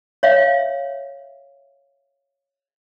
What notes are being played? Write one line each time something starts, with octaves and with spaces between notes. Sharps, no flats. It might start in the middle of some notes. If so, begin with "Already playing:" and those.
C#5 E5 F5